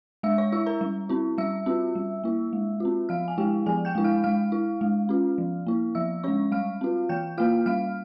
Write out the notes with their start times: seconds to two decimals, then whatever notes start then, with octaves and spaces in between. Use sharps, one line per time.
0.23 G#3 E5 E6
0.38 C#5 C#6
0.52 E4 E5 E6
0.66 A#4 A#5
0.81 G3
1.09 C4 E4
1.38 G3 E5 E6
1.66 C4 F4
1.95 G3
2.24 A#3 E4
2.53 G#3
2.80 C4 F4
3.09 F3 F5 F6
3.28 G#5
3.38 G#3 E4 G4 G5
3.66 F3 G#4 G#5
3.85 G5 G6
3.95 G#3 E4
4.04 F5 F6
4.24 G#3 F5 F6
4.52 E4
4.81 G#3
5.09 C#4 F4
5.38 F3
5.67 A#3 E4
5.95 F3 E5 E6
6.24 G#3 C#4 C#5 C#6
6.52 G3 F5 F6
6.81 C4 F4
7.09 E3 G5 G6
7.38 A#3 F4 F5 F6
7.66 G3 F5 F6